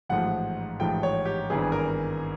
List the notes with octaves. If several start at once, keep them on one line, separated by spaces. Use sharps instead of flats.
A1 G#2 F3 A3 F#5
A1 G#2 F3 A3 G5
C#5
G4
G#1 G2 E3 G3 B3 G#4
A#4